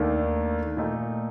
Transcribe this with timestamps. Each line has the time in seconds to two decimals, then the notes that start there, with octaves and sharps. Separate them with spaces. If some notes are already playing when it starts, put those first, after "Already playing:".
Already playing: D#2 D#3 A3 D4
0.77 A#2 A3 D#4